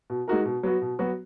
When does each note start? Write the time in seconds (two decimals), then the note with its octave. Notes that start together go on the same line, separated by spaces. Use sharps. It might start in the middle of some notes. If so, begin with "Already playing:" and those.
0.10 B2
0.28 G#3 D#4 F#4 A#4
0.45 B2
0.63 F#3 B3 F#4
0.81 B2
0.99 F#3 B3 F#4